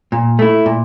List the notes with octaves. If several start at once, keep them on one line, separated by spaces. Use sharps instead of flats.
A#2
A3 E4
A#2